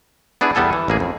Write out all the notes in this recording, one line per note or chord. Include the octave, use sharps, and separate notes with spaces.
B3 D4 E4 G#4
E2 G3 B3 A4 G#5
E3
A1 A#3 G#4
F2